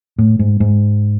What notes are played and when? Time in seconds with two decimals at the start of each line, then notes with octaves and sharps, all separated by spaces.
0.18 A2
0.39 G#2
0.60 G#2